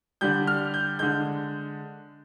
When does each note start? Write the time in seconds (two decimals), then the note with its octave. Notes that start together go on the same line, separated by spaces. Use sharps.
0.21 D3 G3 G6
0.47 F6
0.74 G6
0.99 D3 G#3 G6